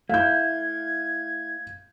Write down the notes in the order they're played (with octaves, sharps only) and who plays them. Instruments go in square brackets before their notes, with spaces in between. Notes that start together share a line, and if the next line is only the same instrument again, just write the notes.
[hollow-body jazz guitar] A3 E4 [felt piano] F5 G6 [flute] G#6